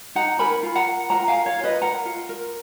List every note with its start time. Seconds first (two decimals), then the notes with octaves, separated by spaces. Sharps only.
0.15 D#4 F#5 A#5
0.39 A#4 G#5 B5
0.63 F4
0.75 F#5 A#5
0.87 A#4
1.10 F4 F#5 A#5
1.28 F5 G#5
1.34 A#4
1.46 C#5 F5
1.58 F4
1.64 B4 D#5
1.82 A#4 F#5 A#5
2.05 F4
2.29 A#4